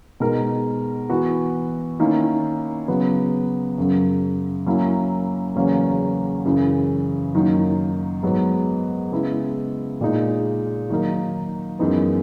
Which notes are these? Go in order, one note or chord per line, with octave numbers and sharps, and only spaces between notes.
B2 G#3 D#4 A#4
E3 B3 F#4
D#3 A#3 C#4 E4
C#3 F#3 B3
F#2 C#3 F#3
F#3 A#3 C#4 E4
E2 C#3 F#3 A#3 C#4
F#2 C#3 E3
F#2 D#3 F#3 A#3 D#4
G#2 F#3 B3
C#3 G#3 B3 E4
A#2 G#3 D#4
D#3 F#3 A#3 D#4 A#4
F#2 E3 G#3 B3 D#4